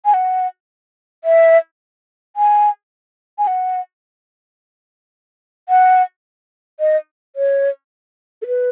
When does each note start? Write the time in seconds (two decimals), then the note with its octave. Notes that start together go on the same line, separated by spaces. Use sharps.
0.05 G#5
0.14 F#5
1.24 E5
2.36 G#5
3.38 G#5
3.47 F#5
5.69 F#5
6.80 D#5
7.36 C#5
8.42 A4
8.46 B4